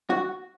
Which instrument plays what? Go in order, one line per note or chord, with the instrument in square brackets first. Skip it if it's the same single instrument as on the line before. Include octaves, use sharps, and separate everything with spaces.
[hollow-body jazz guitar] F#4